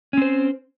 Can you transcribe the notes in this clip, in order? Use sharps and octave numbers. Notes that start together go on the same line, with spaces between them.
C4 C#4 C5